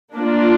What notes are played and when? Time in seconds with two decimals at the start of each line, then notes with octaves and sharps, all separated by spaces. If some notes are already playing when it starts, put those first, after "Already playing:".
0.14 A#3 D4 F4